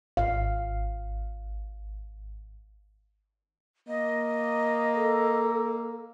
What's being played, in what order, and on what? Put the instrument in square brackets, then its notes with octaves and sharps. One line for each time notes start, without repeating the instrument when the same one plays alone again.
[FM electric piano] G#1 [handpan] F5
[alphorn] A#3 [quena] D#5
[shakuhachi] A4